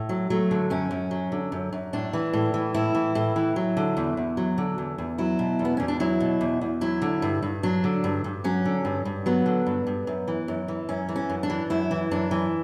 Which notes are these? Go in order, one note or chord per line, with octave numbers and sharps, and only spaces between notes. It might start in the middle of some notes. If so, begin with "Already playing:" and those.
Already playing: A2
F#3
F#3 A3
D3
F#2 C#4
F#2
F#3
D3
F#2
F#2
A2 D4
E3
A2
E3
A2 E4
E3
A2
E3
F#3
D3
E2
E2
F#3
D3
E2
E2
F#3 E4
B2
E2
B3
E2 C#4
D4
F#3 E4
B2
E2
E2
F#3 E4
D3
G2
G2
F#3 D4
D3
G2
G2
F#3 C#4
D3
G2
G2
F#3 B3
D3
G2
G2
F#2
E3
F#2
E3
F#2 C#4
E3
C#4
F#2
D4
E3
F#2 E4
E3
F#2 D4
E3